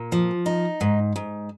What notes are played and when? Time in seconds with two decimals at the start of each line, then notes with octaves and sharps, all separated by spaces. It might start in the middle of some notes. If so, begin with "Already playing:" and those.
Already playing: A#2
0.12 F3
0.46 D#4
0.81 G#2
1.16 G#2